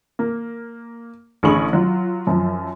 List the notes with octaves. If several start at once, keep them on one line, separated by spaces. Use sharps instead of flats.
A#3
A1 D3 G#4 B5 C#6 F#7
F#3 F4
F#2 F3